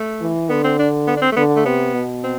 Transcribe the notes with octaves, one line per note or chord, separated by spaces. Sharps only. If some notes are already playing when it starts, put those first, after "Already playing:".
Already playing: A3
E3
D3 B3
C4
D4
B3
D4
C4
A3
D3 B3
A3
C3 B3
B2
C4